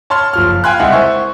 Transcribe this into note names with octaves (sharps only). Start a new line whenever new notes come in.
C#5 A5 B5 C6 F6
F#1 F3 F6
F5 G5 G#5 B5 C6 F#6
C2 G#3 E4 F#5
C5 E5 G#5 C#6